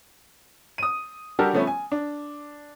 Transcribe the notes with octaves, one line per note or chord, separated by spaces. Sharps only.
D#6 D#7
G3 D4 F#4 G4 A4 A#4
F3 G3 A3 B3 C#4
G#5
D4